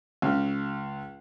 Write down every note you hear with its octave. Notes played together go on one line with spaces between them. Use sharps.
C#2 C#3